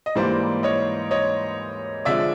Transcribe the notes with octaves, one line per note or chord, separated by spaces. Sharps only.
D#5
G#2 E3 G3 A#3 D4 C5 D5
C#5 D#5
C#5 D#5
D3 F3 G#3 D5 E5